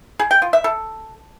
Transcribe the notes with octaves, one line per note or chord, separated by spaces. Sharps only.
G#4
G5
F4
E5
A4